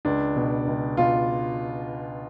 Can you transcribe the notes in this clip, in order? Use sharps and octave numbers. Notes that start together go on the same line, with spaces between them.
C#2 D4
B2
C#2
B2 F4